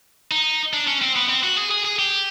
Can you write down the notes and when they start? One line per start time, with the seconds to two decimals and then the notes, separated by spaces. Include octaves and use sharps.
0.31 D#4
0.73 D4
0.87 C#4
1.02 C4
1.16 B3
1.30 C4
1.43 F#4
1.57 G#4
1.71 G#4
1.85 G#4
1.99 G4